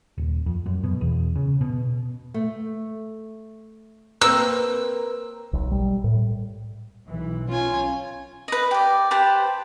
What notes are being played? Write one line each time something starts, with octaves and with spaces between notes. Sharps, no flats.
D#1
F2
F#2
B2
E2
C#3
B2
A3
A#3 C4 A#4 B4 A#5 E6
B1
G3
A2
B1 E3
C#4 F4 G#5
B4 D#5
G4 D5
G4 B4 C5 A5